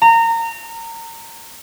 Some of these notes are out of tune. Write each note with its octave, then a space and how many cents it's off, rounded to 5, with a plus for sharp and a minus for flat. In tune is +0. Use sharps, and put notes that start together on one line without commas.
A#5 -25